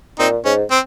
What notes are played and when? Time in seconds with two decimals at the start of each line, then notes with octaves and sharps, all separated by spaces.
0.19 A#2 C4 D#4
0.45 G#2 C#4
0.71 C4